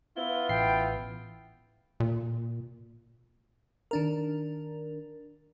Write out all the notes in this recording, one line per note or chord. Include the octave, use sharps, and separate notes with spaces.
B3 E4 F4 G7
A1 G5 C7
A#2
D#3 D4 A#4